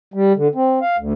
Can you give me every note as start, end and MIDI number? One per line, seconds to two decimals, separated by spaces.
0.14 0.33 55
0.36 0.48 50
0.55 0.79 60
0.81 0.96 77
0.98 1.13 38